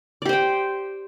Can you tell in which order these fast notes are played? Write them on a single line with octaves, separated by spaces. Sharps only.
D5 G4 C5 G5